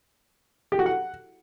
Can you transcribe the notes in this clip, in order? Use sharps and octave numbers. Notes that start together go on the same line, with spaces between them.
G4
F#4
F#5